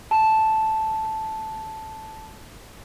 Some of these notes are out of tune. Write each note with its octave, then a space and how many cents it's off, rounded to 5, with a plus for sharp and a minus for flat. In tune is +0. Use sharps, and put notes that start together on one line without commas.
A5 -5